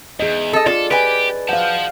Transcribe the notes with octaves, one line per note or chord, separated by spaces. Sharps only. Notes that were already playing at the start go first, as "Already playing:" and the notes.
E2 G#4 D#5
A4 D#5
F4 A4 D5
G4 B4 G#5
C5 F5 F#5 A5